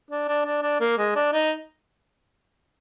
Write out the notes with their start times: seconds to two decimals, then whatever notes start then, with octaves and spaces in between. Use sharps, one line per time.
0.11 D4
0.28 D4
0.45 D4
0.63 D4
0.80 A#3
0.98 G#3
1.15 D4
1.33 D#4